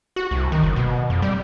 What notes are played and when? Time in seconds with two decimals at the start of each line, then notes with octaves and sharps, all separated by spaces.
0.16 F#4
0.31 C2
0.52 D#3
0.63 F#1
0.76 B2
1.10 F2
1.22 G3